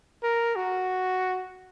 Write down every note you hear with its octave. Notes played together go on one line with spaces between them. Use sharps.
A#4
F#4